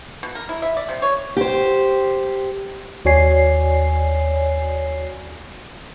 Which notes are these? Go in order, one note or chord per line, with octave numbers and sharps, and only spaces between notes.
B2
A#4
E4
E5
D5
C3
C#5
G4 C5
D#2 F#4 C#5 D5 G#5 C7